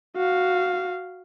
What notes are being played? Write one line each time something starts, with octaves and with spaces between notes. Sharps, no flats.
F#4 F5